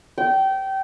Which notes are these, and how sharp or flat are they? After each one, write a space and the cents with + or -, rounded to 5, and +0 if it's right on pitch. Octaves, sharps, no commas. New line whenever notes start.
G5 -25